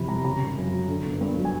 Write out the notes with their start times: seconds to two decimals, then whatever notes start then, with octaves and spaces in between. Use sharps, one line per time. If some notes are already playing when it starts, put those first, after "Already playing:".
Already playing: F2 C3 E3 B5
0.08 G3 A#5
0.25 C#3 A#5
0.41 G#1
0.57 F#2
0.73 F#3
0.89 D3
1.05 G1
1.21 G2
1.37 F#3
1.45 G#5